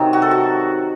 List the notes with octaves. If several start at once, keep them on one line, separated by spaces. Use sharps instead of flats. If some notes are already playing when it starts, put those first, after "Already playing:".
Already playing: C3 D#3 F#3 D#4
F#4
A4
F#4